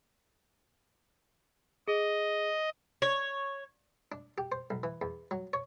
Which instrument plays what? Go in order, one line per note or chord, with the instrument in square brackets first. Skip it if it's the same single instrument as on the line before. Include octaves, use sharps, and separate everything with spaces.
[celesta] G#4 [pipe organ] D#5
[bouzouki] C#5
[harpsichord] D4
G4
C5
B1
E3
E2
F#3
C#5